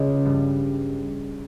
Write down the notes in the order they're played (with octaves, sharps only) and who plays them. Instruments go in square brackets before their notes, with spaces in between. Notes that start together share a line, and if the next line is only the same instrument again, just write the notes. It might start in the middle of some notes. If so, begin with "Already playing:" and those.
Already playing: [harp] C#2 C#3
G2 G3